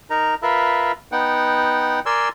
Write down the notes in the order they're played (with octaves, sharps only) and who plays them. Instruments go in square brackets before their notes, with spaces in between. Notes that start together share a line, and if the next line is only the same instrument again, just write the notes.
[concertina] D#4 A#4 A#5
F4 A#4 B4 E5
B3 D#4 F#5 G5
A#4 D5 G#5 C6 E6